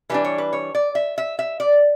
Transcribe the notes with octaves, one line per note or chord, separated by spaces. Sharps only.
E3 G3 D4 B4
C#5
B4
C#5
D5
E5
E5
E5
D5